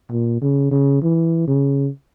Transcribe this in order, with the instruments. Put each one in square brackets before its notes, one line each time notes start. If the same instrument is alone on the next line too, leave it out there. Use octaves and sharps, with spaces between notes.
[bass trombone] A#2
C#3
C#3
E3
C#3